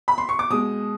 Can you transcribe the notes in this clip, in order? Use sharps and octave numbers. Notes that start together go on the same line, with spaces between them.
B5
C6
C#6
D6
B2 G#3 D#6